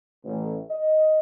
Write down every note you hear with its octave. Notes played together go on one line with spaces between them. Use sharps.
A1
D#5